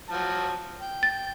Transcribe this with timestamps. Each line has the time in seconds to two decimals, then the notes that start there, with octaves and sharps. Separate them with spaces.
0.09 F3 F#3 A5
0.80 G5
1.03 A6